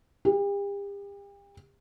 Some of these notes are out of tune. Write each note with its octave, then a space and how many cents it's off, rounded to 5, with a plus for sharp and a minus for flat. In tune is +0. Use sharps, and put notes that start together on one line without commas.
G4 +40